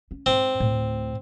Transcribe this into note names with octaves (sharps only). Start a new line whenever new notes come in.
C#4
G#2 C4
D2 A2